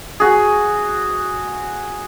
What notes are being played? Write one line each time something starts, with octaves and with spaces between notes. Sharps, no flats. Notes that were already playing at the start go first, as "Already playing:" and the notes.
F#4 G#4